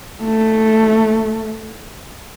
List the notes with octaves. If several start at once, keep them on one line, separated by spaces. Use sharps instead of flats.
A3